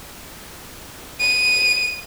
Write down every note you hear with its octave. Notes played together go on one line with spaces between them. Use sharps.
D#7